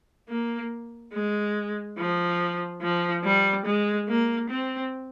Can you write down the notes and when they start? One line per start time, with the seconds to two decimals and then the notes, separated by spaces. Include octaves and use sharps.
0.29 A#3
1.13 G#3
1.97 F3
2.81 F3
3.24 G3
3.65 G#3
4.08 A#3
4.49 C4